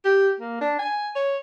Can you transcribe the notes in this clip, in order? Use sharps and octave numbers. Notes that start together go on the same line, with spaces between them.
G4
A#3
D4
G#5
C#5